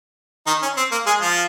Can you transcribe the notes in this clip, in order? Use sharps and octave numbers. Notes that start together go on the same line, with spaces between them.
D#3 D#4
C#4
C4
A#3
G#3 G#4
F3 F4